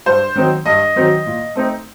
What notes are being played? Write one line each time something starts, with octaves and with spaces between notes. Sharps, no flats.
G2 C5
D#3 F#3 C4 D#4
G2 D#5
D#3 F#3 C4 D#4
A#2
A3 C4 D#4